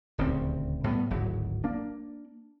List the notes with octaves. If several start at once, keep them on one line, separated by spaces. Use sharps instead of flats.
D#1 D2 C#3 C4
A2 G3 B3
D1 G#1 F#3
A#3 D4